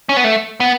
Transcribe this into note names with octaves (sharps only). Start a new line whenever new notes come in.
C#4
B3
A3
B3